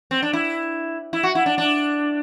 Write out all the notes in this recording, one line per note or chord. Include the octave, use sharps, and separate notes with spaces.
C4
D4
E4
E4
F#4
E4
D4
D4